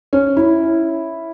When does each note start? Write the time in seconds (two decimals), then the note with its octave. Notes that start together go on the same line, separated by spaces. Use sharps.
0.13 C#4
0.37 E4